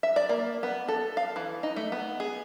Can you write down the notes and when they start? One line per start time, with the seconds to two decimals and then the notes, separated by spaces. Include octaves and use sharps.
0.03 E5
0.16 D5
0.29 A#3
0.63 B3
0.88 A4
1.17 F5
1.36 E3
1.63 D#4
1.76 A3
1.92 B3
2.20 G#4